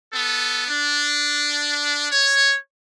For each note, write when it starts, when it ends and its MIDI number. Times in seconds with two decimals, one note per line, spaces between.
0.12 0.65 59
0.12 0.65 69
0.67 2.07 62
2.11 2.56 73